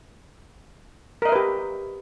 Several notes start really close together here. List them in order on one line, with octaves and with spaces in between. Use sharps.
A#4 D#5 E5 B4 G4